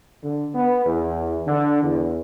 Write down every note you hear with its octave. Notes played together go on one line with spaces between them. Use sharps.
D3
B3
E2
D3
E2